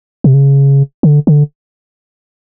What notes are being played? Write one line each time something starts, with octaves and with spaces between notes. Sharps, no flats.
C3
C#3
D3
D3